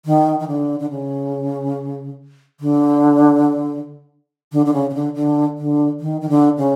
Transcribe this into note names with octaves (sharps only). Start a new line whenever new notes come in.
D#3
D#3
D3
D3
C#3
D3
D3
D3
C#3
C#3
D3
D3
D3
D#3
D#3
D3
C#3